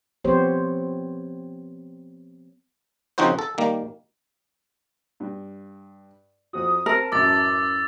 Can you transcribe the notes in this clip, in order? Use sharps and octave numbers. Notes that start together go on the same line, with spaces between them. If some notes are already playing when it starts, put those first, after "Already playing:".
F3 B3 C4 G4 C5 C#5
C#3 F3 C4 D#4 F#4 C5
A4
D#3 G3 A#3
G2
F2 C4 F#4 D#6
C4 A#4 A5
A1 F#2 D6 E6 A6